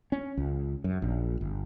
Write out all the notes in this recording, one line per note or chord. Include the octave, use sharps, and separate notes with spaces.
C#4
C#2
F#2
A#1
G1